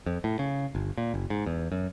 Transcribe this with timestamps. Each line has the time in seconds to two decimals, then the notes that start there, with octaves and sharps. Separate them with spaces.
0.06 F2
0.24 A2
0.39 C#3
0.75 G1
0.97 A#2
1.14 F#1
1.30 G#2
1.46 E2
1.72 F#2